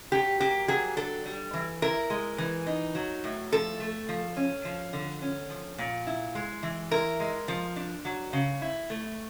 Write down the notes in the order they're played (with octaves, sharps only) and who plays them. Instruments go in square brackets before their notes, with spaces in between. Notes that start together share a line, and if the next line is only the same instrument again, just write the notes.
[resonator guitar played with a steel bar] F#3 G4
A#3 G4
F#3 G#4
D4 A4
G3
E3
E4 A#4
G#3
E3
D#4
F#3
A2
F3 A4
A3
F3
C#4
F3
D3
C#4
F3
A#2
E4
G#3
E3
E4 A#4
G#3
F3
D4
F#3
C#3
E4
A3